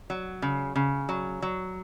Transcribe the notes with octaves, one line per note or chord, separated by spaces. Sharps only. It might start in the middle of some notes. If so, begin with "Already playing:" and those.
F#3
C#3
C#3
F#3
F#3